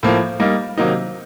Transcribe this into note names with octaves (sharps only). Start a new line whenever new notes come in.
A2 F3 A#3
G3 A#3 D#4
C3 D#3 F#3 A#3 D#4